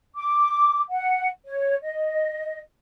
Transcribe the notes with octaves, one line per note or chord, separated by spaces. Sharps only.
D6
F#5
C#5
D#5